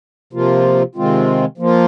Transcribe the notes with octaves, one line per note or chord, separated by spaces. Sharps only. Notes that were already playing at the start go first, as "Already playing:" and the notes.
C3 F3 A#3 F4
C3 D#3 G#3 C4 F4
F3 A#3 F4